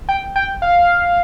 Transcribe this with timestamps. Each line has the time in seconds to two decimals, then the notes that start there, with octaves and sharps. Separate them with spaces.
0.09 G5
0.36 G5
0.62 F5